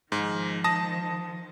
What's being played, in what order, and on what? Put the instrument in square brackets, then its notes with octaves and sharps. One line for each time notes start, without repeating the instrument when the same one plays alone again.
[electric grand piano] G#2 [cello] D#3 F3
[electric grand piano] A5 D#6 A#6